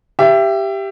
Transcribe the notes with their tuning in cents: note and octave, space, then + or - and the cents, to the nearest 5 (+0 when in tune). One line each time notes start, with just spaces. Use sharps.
G4 +0 E5 +25